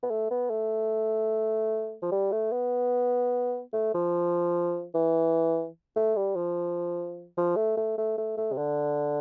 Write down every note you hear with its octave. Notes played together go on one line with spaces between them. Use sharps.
B3
A3
B3
A3
F3
G3
A3
B3
A3
F3
E3
A3
G3
F3
F3
A3
A3
A3
A3
A3
C3
D3